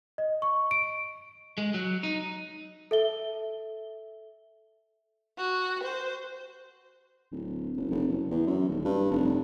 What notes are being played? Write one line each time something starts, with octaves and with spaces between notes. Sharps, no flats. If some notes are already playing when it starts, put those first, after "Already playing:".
D#5
C#6
D7
G#3
F#3
D#4
A4 E5 G7
F#4
C5
D1
F#1
F1
F#1
E2
F#2
D#1
G2
F1